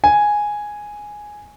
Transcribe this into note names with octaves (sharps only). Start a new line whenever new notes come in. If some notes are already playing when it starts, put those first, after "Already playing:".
G#5